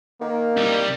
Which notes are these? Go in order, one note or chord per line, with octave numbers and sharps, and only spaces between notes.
D#3 A#3
C2 G3